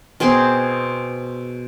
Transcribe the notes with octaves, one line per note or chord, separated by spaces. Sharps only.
B2 C4 G#4 C6